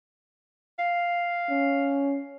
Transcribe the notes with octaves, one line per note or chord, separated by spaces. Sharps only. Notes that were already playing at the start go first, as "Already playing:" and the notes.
F5
C#4